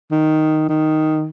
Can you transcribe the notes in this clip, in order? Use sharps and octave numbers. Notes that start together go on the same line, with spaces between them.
D#3
D#3